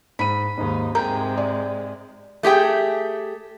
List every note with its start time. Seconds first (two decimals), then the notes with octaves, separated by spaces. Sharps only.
0.19 G#2 B5 D#7
0.58 D#2 G#2 D#4
0.95 G#2 C3 G#3 A#4 G5 A#5
1.37 D5
2.43 A3 G4 G#4 G5